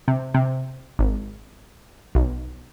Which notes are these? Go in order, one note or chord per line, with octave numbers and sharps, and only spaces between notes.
C3
C3
G#1
B1